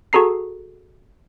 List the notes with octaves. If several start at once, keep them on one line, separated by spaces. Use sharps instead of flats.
F#4 G#4 A4 A#5 C7